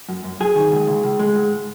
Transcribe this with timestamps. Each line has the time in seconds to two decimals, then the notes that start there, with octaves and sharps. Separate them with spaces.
0.09 F#2
0.24 F#2
0.40 F#2 G#4
0.55 D#3
0.72 C#2
0.87 C#2
1.04 C#2
1.19 G#3
1.35 G#2